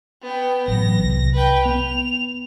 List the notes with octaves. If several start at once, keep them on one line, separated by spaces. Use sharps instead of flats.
B3 G5
A1 F#3 A#6
C2
B4 G5
B3 F7